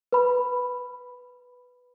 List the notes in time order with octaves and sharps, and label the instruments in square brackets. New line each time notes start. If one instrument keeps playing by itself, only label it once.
[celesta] B4 B5